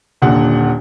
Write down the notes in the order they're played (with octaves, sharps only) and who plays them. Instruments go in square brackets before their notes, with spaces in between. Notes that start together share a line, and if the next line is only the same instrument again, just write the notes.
[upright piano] D#1 A#2 D3 F#5